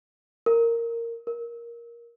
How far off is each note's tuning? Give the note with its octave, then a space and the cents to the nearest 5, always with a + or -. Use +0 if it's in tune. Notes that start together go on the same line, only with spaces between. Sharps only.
A#4 -10
A#4 +10